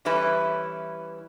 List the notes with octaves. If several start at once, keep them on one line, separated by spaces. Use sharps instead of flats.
E3 G3 C#4 E4 B4